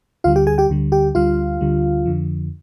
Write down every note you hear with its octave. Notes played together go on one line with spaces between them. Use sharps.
D2 D3 G3 F4 F5
G4 G5
G#4 G#5
G4 G5
D2 D3 G3
G4 G5
D2 D3 G3 F4 F5
D2 D3 G3
F2 D3 F3